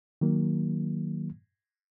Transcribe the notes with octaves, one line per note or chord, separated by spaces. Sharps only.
D#3 F#3 A#3